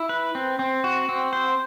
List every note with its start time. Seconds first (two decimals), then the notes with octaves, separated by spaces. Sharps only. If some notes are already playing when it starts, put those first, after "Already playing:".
Already playing: E4
0.09 B4
0.35 C4
0.59 C4
0.84 F#4
1.09 C4
1.33 C5